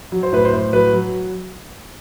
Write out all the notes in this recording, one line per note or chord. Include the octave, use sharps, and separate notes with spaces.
F#3
C5
A2 B4
C5
A2
F#3 B4
F#3